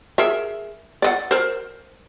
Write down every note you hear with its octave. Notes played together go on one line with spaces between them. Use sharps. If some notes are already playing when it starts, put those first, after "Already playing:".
G#4 A#4 E5
D5 D#5 F#5
A#4 C5